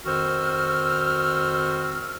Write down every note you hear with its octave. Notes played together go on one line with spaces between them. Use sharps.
F2 D#3 F#4 C5 E6 F6